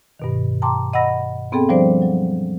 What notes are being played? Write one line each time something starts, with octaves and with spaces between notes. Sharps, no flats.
G2 B2 D#3
G5 A5 A#5 C6 D6
D#5 F#5 B5 E6 A#6
B3 C4 G#4 A4 G5
F3 G3 D4 C5 D5
F#3